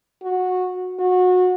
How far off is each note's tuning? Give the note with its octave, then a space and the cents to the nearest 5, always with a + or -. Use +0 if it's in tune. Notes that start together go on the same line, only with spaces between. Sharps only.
F#4 -15
F#4 -25